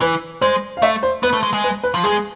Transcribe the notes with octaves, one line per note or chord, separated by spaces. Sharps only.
E3 B4
G#3 C5
F5
A3 E5
C5
B3 B4
A3
G#3
G#3
B4
B4
F3
G#3 G#4